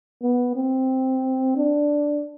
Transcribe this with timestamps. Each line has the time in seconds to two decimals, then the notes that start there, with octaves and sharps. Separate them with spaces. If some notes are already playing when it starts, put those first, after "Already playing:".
0.23 B3
0.56 C4
1.57 D4